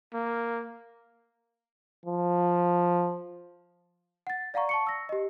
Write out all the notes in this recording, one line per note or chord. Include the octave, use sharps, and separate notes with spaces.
A#3
F3
F#5 A6
D5 F5 F#5 A#5 C#6
A5 C#6 C#7
E6 A#6
G4 D#5